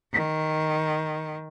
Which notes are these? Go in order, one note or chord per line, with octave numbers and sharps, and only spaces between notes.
D#3